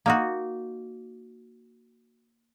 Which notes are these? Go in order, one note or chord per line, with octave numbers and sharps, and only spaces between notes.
A#3 D#4 F#4